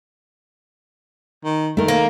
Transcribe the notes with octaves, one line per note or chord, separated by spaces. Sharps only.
D#3
D#3 A3 A#4
A#3